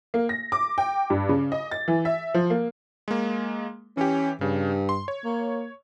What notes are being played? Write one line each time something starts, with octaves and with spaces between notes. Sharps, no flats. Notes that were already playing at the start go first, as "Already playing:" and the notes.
A#3
A#6
D6
G5
G2
C#3
D#5
A6
E3
E5
F3
A#3
G#3 A#3
E3 C#4 G4
G2 C#3
C6
C#5
A#3